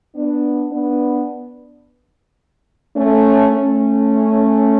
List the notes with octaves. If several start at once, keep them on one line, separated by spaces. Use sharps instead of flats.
B3 D4
B3 D4
A3 C#4
A3 C#4